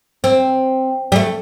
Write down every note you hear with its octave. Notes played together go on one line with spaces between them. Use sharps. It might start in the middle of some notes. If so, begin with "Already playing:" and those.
C4
G3
A3